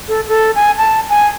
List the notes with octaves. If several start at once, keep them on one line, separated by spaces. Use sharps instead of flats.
A4
A4
G#5
A5
G#5